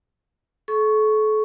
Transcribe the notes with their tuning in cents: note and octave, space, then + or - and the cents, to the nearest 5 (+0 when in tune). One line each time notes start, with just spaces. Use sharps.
A4 -35 C#6 +0